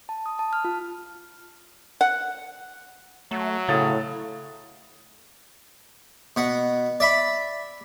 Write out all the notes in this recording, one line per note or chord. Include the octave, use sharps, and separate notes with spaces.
A5
D#6
A5
F6
F4
F#5
F#3 A3
A2 C#3 F5 D#6 A6
B2 F#5
D5 E5 B5